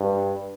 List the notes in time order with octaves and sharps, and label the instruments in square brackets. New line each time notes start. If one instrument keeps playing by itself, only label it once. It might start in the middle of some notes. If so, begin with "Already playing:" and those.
Already playing: [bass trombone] G2